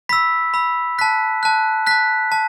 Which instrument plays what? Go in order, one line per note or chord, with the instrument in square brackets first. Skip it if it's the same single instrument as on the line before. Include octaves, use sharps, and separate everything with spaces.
[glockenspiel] B5 E6 B6
B5 E6
A5 F#6 B6
A5 F#6
A5 F#6 B6
A5